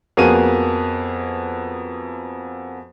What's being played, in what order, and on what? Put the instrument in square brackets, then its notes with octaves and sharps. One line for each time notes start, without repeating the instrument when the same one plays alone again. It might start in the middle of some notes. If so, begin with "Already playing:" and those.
[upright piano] F2 A#3 B3 F#4 G#4 D#7